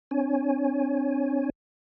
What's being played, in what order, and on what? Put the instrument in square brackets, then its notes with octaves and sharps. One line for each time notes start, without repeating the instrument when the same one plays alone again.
[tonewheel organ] C4 D4 C#5 G#5